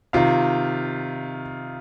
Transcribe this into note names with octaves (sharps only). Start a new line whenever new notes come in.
C3 D#3 F4 F5